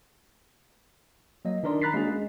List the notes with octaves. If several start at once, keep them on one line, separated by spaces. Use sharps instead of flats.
F#3 A#3 D#5
D#3 D4 D#4 A#4 D5 C6
A#5 B5 F#6 A6 B6 C7
G#3 A#3 C#4 D4 F#4 G#4
G#3